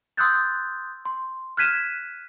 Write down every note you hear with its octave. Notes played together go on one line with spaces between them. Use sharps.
C6 D#6 E6 F#6 G6 A6
C6
F6 F#6 G#6 B6 D#7 E7